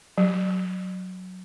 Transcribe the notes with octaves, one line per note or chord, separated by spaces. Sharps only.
F#3